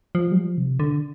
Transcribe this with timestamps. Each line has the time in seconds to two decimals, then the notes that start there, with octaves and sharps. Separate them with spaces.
0.15 F3
0.32 G3
0.36 F3
0.58 C3
0.80 D3